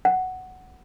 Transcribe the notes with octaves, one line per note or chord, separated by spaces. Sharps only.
F#5